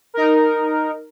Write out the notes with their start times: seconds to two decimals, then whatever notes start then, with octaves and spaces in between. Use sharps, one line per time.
0.14 D#4 A#4